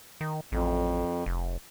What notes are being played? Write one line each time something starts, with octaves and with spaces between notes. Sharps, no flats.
D#3
A1 F2
F1